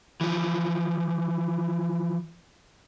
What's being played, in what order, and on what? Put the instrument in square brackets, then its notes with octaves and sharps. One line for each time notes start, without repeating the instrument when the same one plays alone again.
[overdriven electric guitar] E3 F3